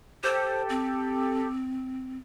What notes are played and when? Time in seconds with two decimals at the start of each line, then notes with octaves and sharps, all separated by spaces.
0.24 G4 A4 C5
0.69 C4